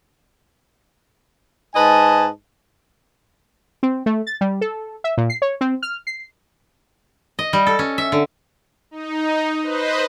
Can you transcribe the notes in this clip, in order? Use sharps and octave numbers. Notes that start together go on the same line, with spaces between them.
G#2 B4 D#5 G#5 A5
C4
A3
A6
G3
A4
E5
A#2
C7
C#5
C4
F6
C7
D#5
G3
A4
C#4
E5
D3
D#4
B4 C5 D#5